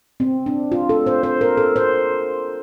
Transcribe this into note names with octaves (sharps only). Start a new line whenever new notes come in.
C4
D4
F4
A4
C5
C5
A#4
A4
C5